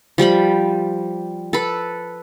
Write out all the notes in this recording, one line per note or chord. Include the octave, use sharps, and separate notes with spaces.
F3 G3 G5 B5
A4 B4